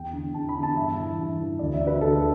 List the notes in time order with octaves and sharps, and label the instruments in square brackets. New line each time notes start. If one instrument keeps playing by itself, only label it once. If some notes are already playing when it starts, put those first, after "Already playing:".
Already playing: [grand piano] E2 G5
D3
E2 A5
B5
D3
A5
G2 E5
E3
G2
E3
D2 D5
E5
D3
B4
D2 A4